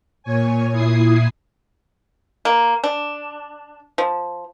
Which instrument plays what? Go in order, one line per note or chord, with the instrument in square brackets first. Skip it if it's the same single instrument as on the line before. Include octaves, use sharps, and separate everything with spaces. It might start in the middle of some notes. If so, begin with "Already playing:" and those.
[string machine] A#2 C#5 G#5
A#2 E4 D#6 G#6 C7
[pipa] A#3
D4
F3